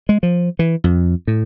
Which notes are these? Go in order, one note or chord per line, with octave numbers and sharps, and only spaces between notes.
G#3
F3
E3
F2
A2